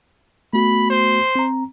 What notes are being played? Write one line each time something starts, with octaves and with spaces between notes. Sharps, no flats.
A3 B3 F#4 B5
C5
C4 A#5